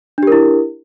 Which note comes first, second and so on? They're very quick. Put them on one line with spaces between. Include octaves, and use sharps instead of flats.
D4 G4 A#4 E4